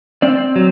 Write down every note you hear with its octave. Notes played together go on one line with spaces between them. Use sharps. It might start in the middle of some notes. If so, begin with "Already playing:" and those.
C4 D5
F#3